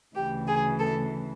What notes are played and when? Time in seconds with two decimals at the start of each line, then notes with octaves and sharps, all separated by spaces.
0.15 D2 C#3 E3 G4
0.48 G#4
0.80 A4